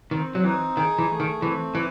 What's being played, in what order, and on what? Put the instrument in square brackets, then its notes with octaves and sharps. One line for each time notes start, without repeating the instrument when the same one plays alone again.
[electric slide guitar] D#3 [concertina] C4
[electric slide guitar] F#3
[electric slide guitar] E3 [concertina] D#4
[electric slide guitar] D#3 [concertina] G#4
[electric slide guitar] E3
[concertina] A3
[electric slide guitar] D#3
[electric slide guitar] E3 [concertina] C4
[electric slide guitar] E3 [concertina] E4